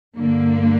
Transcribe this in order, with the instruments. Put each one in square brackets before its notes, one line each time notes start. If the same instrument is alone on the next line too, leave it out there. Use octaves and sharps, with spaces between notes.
[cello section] G2 D3 A#3